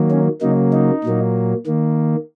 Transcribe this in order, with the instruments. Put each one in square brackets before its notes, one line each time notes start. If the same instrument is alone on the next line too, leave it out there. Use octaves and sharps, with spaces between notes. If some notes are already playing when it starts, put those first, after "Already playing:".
Already playing: [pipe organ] D#3 F#3 A#3
C#4
C#3 F#3 A#3 D#4
D#4
A#2 F#3 A#3
D#3 A#3